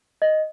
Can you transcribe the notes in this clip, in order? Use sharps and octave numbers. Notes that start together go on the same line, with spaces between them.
D#5